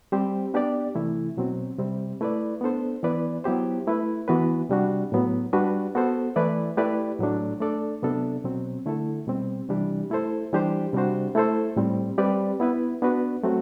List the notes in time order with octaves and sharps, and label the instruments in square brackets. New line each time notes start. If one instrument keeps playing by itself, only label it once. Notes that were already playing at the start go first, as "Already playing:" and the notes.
[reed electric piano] G3 C4 G4 C5
B3 D4 G4 D5
C3 E3 A3 E4
B2 F#3 C4
C3 G3 C4
A3 E4 B4 D5
B3 D4 A4 C5
E3 B3 E4 B4 D5
F#3 B3 E4 G4 C5
A3 E4 B4
E3 B3 F#4 B4
C3 G3 D4 F#4
A2 F#3 B3
G3 D4 F#4 B4
B3 F#4 A4 C5
E3 A3 E4 B4 D5
A3 E4 G4 B4 D5
A2 F#3 A3 D4
A3 D4 A4 D5
C3 F#3 B3 D4 A4
B2 F#3 C4
D3 A3 E4 A4
B2 G3 C4
C3 E3 G3 D4 G4
A3 E4 A4 C5
E3 G3 D4 G4 C5
C3 G3 D4 F#4 C5
A3 E4 A4 C5
A2 G3 C4
G3 C4 G4 B4 D5
B3 E4 B4
B3 D4 F#4 B4
F#3 A3 C4 F#4